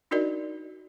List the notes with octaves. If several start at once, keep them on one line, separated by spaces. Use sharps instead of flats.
D4 D#4 F#4 A#4 D5 D#5